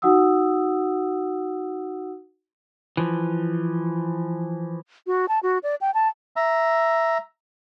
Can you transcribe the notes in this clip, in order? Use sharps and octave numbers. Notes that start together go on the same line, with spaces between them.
D#4 F#4 F#5 D#6 E6
E3 F3
F#4
A5
F#4
D5
G5
A5
E5 A#5